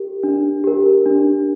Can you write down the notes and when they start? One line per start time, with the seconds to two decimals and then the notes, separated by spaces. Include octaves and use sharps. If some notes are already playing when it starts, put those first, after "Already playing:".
Already playing: G4 A#4
0.23 D4
0.64 G4 A#4
1.06 D4